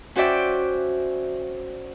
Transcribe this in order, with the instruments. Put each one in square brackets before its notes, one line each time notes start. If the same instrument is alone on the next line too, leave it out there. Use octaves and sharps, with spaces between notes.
[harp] C#4 F#4 C5 D5 E5 G5